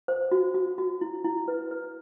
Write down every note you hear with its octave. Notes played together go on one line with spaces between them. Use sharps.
C5
F#4
F#4
F#4
E4
E4
B4
B4